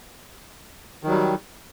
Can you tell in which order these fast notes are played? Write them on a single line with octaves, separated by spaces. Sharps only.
D#3 F#3 G3